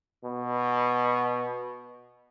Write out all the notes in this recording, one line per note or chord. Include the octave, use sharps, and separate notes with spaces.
B2